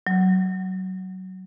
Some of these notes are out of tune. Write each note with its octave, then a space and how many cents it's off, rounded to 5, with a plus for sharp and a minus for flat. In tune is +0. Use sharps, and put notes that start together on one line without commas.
F#3 +15